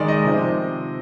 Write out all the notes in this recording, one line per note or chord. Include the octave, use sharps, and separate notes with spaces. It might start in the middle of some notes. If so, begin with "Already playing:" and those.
Already playing: D#3 G#3 D#4 D5
D#5
C3 F3 C4